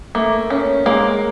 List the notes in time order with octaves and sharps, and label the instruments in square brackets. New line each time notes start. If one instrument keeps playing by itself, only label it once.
[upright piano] A3 [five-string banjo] A#3
[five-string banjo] C#4
[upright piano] G#3 [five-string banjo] A#3